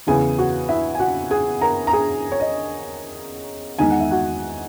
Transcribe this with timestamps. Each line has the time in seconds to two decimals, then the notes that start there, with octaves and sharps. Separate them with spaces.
0.07 E2 C#3 E3 B3 E4 G#4 G#5
0.38 F#4 F#5
0.69 E4 E5
0.95 G#5
1.00 F#4 F#5
1.31 G#4 G#5
1.61 A#4 A#5
1.87 A#5
1.93 G#4 G#5
2.32 C#5
2.40 D#5
3.78 E2 D#3 G#3 D#4 G#5
3.90 F#5
4.00 E5
4.11 F#4 F#5